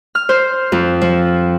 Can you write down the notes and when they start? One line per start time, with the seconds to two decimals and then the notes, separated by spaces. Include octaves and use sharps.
0.15 F6
0.29 C5
0.72 F2
1.01 F3